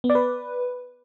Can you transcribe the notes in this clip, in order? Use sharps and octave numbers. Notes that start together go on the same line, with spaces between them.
B3
D5
B4